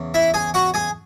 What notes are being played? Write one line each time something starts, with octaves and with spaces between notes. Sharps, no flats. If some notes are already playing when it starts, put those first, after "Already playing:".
Already playing: E2 C#3
E4 E5
G#4 G#5
F#4 F#5
G#4 G#5